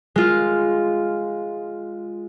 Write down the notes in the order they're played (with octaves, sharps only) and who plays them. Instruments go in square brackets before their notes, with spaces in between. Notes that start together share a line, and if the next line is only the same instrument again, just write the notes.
[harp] G#3 F4